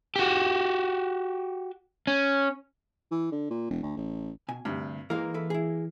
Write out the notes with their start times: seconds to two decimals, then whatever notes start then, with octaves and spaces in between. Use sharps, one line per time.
0.16 F#4 G4
2.07 C#4
3.12 E3
3.32 D3
3.50 A#2
3.70 E1
3.83 D2
3.96 A1
4.49 B2 G#5
4.65 D2 G2 C3
5.10 E3 G#3 A#3 A#4 F5
5.34 E4 A4 B4
5.50 E4 G#4